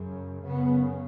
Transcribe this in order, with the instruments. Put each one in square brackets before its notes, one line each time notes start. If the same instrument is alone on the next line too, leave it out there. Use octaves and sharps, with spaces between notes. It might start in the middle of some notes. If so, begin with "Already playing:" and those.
Already playing: [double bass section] F#2 C#3
F#2 C#3 B3